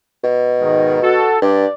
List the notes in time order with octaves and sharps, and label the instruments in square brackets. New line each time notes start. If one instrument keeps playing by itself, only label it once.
[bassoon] B2
[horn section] G#2 D#3
F#4 A4
[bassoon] G2 [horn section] D5